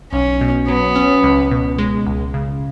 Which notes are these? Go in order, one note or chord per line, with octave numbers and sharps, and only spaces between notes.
B1 C#4
B2
F#3 B3
C#4
C#2
B2
G#3
C#2
C#3